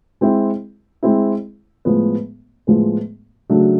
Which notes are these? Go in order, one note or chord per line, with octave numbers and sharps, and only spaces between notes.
G#3 C4 E4
G#3 C4 E4
A2 F3 G#3 B3
A2 F3 G#3 B3
C#3 F#3 A3 D4 F#4